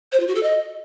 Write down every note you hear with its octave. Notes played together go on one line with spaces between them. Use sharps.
C5
F4
F#4
A4
D#5